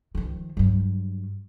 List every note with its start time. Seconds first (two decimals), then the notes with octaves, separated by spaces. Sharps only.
0.15 D#3 F3
0.57 G2 F#3